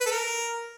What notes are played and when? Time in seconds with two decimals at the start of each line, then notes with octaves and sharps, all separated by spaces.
0.01 B4
0.06 A4
0.11 A#4